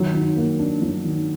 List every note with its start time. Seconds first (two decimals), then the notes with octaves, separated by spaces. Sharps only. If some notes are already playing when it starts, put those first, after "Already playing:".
Already playing: D#3 F#3
0.14 D#3
0.37 A#3
0.59 D4
0.82 F#3
1.04 D#3